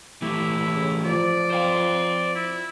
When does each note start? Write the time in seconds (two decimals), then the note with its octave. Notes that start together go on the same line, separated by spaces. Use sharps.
0.22 E3 A3 E4 G4
0.75 C#3
1.04 F3 D5
1.51 C5 F5 G5
2.35 E4